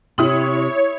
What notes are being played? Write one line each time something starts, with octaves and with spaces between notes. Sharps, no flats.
C3 E4 C#5 D#6 F#7